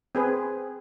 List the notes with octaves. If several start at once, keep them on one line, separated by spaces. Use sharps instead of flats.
C4 G#4 B4